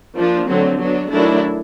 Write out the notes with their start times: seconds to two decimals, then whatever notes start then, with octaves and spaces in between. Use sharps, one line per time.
0.17 F3 A#3 D4
0.47 D3 F#3 A3 C4
0.79 F#3 B3 D4
1.10 D#3 F#3 A3 D4 E4